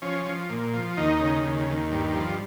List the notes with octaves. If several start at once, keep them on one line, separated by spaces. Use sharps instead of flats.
F3 C#4
F3
A#2
F3
D#2 D#4
C#3
D#2
D#2
G2
F3